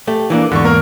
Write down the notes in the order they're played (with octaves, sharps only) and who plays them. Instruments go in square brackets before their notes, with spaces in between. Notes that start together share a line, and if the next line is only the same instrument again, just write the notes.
[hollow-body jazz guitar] A3 G4
E3 A#3 D4
[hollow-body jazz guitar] E2 G#2 [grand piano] D3 C#6
[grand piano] A#3 A#4